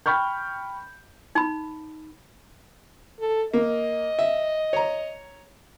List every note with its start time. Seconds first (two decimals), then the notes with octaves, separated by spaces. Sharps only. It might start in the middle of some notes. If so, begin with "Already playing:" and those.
0.06 G5 B5 C#6 F6 G6
1.35 D#4 B5
3.20 A4
3.53 A#3 D#5
4.19 E5
4.73 C#5 A#5